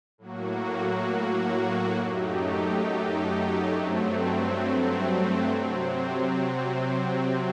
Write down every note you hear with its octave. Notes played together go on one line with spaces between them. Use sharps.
A2 F#3 A#3 F#4
F#2 F#3 A3 D#4 G4
G2 F#3 A3 C4
C3 F#3 C4